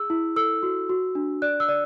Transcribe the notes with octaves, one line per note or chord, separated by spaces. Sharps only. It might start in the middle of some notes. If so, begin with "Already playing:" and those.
Already playing: G#4 E6
E4
A4 E6
F#4
F#4
D4
D5 F#6
E6
D5